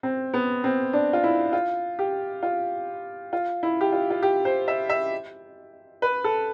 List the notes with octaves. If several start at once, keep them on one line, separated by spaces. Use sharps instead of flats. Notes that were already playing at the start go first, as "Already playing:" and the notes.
C4
B3
C4
D4
F4
E4
F4
G4
F4
F4
E4
G4
F4
F4
G4
C5
E5
E5
B4
A4